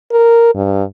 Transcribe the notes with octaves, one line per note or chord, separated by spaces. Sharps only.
A#4
G2